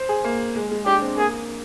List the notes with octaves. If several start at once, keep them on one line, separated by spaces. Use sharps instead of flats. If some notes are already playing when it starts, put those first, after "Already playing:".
Already playing: C5
G#4
A#3
G#3
G#3
D4 G4
C4
A#3 G#4